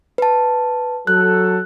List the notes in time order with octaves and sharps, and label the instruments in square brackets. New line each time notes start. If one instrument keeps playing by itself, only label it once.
[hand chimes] B4 A5
[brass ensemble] F#3 A4 [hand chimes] F#6